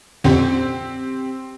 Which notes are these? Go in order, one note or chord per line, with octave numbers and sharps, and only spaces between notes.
F2 A#2 D3 C4 G4